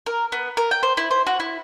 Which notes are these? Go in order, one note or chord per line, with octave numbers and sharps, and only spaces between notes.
A#4
B3
A#4
G5
C5
E4
C5
F#4
E4